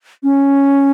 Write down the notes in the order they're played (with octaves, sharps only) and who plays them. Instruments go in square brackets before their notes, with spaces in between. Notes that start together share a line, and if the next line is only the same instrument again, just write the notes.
[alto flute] C#4